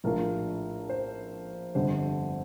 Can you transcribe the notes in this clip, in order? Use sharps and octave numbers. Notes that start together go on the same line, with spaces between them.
A#1 A2 A3 D4 F4 A#4
C5
G1 F2 D3 G3 C5